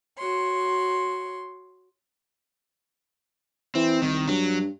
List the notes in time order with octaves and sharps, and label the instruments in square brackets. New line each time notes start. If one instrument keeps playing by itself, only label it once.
[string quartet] F#4 C#5 C6
[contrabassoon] E3 [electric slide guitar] C4
[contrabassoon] C2 [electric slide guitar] D#3
[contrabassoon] G2 [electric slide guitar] F#3